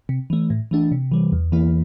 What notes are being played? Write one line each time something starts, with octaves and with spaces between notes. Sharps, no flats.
C3
E3 A3
A2
E3 A3 D4
C3
E3 G3
E2
E3 A#3 E4